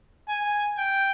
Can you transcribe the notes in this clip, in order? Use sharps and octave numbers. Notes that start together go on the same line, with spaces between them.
G#5
G5